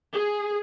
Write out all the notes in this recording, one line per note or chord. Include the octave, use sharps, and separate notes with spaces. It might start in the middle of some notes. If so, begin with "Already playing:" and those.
G#4